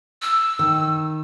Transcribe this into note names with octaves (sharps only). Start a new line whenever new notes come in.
E6
D#3